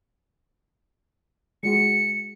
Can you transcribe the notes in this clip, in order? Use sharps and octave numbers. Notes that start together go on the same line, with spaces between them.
G#3 F#4 G#4 C#7